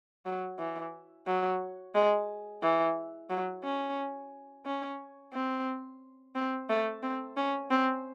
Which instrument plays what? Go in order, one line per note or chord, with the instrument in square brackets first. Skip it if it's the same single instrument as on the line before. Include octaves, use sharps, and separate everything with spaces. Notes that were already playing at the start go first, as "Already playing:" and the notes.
[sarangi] F#3
E3
F#3
G#3
E3
F#3
C#4
C#4
C4
C4
A3
C4
C#4
C4